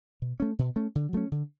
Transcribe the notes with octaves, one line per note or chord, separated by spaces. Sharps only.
B2
A3 C#4
B2
A3 C#4
D3
F#3 A3 C#4
D3